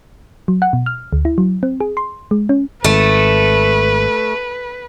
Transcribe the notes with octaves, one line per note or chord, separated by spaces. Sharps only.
F#3
F#5
B2
F6
D2
E4
F#3
C4
G#4
C6
G#3
C#4
G#1 A3 B4